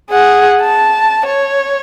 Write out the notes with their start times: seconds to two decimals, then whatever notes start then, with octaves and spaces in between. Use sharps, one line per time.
0.11 G#4 F#5
0.62 A5
1.26 C#5